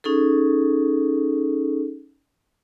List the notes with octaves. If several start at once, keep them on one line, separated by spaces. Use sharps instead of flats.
C#4 D#4 G#4 A4